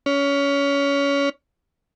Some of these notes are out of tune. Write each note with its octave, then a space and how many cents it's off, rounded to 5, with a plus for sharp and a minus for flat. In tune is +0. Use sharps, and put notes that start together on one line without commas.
C#4 +20